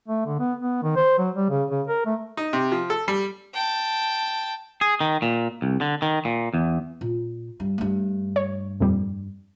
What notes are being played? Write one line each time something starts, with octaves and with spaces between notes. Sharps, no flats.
A3
D3
B3
B3
D#3
C5
F#3
G3
C#3
C#3
A#4
A3
D#4
C3
F3
A4
G3
G5 A5
G#4
D#3
A#2
C2
D3
D#3
A#2
E2
A#2
G2
G2 A3
C#5
F2 A#2 G3